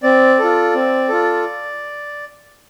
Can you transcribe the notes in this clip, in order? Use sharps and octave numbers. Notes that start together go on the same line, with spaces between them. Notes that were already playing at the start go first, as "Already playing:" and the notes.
C4 D5
F4 A4
C4
F4 A4